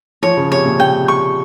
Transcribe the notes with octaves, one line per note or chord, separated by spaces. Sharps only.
F3 C#5
C#3
C3 C#5
A#2
C3 G5
C#6